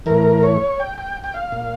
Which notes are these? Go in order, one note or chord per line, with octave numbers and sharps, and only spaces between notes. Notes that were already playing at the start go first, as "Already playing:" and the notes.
A2 E3 A#4
C#5
G5
G5
G5
F5
A#2